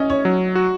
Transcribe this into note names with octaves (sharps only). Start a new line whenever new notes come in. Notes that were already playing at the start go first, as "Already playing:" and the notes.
Already playing: C#4 D#5
C#5
F#3
F#4